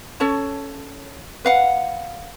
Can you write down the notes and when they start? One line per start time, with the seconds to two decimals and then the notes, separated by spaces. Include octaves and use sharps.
0.20 C#4 A4 C#5 A5
1.45 B4 F5 F#5